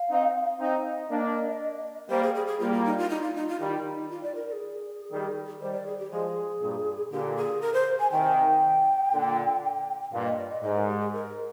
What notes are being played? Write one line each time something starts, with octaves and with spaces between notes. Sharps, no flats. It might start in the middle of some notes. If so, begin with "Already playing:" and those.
Already playing: F5
C4 D#4
C4 D#4 F5
D#5
A#3 D4
G3 A#3 C5
G#4
G#4
G#4
G3 A#3 F4
F4
D#4
F4
D#4
F4
D#4
F4
D#3 G3 D#4
F4
D5
A#4
A#4
G#4
D#3 G3
D#3 G3 C5
D5
G#4
G4
F3 G#3 G#4
G2 A#2
A#2 D3 G4
G#4
A#4
C5
G#5
C3 D#3 G5
A#2 D3
G2 A#2 F5
D#5
D5
D#5
G#2 D#5
A#4
G4
G#4
A#4